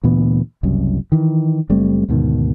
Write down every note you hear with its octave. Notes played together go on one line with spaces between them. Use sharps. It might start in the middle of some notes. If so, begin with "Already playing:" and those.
D2 A#2 E3 B3
F#1 C2 F#2
D#3 E3
F#1 G3 A3 C4
D2 G#2 B2 D#3